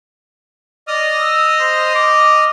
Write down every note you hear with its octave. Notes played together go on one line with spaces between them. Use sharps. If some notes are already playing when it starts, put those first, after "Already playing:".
D5 D#5 D#6 F6
E6
C5
D6